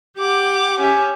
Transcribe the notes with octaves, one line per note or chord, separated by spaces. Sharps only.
G4 F#5 D6
C#4 G4 E5